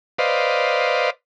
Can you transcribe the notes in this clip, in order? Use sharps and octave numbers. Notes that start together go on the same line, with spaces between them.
B4 C5 D5 D#5 F5